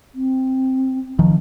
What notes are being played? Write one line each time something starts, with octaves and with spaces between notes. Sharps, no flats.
C4
D#3 F3